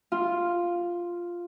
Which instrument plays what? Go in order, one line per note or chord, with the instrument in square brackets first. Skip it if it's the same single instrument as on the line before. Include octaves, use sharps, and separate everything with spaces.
[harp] F4